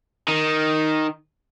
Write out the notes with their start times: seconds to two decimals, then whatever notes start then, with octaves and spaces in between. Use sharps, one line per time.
0.28 D#3